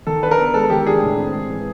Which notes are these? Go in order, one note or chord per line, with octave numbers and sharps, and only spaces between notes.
D#3 A4
D4 B4
A#4
B3
G#3 A4
D#3 G4
D4 G#4
A2
C4
G#3
E3